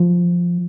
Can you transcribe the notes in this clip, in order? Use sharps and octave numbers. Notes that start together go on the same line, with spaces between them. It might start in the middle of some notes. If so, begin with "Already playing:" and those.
Already playing: F3